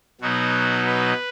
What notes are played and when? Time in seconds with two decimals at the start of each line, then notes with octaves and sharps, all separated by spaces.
0.21 B2 F#3 B3 D#4 F#4
0.87 B4